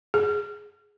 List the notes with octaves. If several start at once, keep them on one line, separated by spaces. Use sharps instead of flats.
G#4